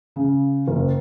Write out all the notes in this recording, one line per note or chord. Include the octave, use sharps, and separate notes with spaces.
C#3
F#1